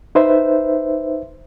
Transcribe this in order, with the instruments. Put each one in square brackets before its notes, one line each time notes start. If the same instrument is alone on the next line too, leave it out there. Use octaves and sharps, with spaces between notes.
[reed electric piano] D#4 B4 C5 E5